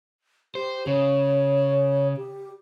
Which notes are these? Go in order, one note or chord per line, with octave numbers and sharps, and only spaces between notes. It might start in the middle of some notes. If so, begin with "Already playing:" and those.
G4 C5
C#3 C#5
G4